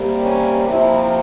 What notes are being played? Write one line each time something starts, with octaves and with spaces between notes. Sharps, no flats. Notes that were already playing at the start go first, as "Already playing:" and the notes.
Already playing: C3 G3 A#3
C#4
C3 F3 A#3 E4